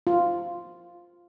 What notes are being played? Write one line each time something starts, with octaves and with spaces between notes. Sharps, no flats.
F4